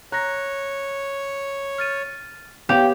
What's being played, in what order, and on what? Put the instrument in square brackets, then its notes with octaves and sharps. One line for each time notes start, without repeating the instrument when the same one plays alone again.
[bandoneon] C#5 [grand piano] A#5 [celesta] F#6 A#6
[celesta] F6 A6 D#7
[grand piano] B3 C#5 F7 [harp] G4 [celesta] F5 G5